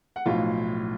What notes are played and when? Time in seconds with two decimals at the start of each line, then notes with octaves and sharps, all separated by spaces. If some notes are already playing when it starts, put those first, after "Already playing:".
0.16 F#5
0.26 B1 A2 F3 F4 F5